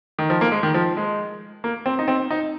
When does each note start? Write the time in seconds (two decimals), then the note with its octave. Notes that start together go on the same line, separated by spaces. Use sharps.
0.19 D#3
0.30 F3
0.41 A#3
0.52 G#3
0.63 D#3
0.74 F3
0.97 G#3
1.64 A#3
1.86 C4
1.99 D#4
2.08 C4
2.30 D#4